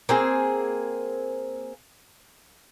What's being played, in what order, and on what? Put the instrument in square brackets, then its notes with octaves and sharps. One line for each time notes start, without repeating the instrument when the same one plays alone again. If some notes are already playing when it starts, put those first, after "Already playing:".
[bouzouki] A#3 C4 G#4